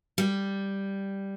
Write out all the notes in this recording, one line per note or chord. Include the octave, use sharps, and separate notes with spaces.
G3